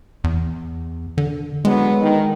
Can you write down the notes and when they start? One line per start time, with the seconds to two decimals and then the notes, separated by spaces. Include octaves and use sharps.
0.24 E2
1.18 D3
1.65 D3 F#3 G#3 B3
2.00 D#3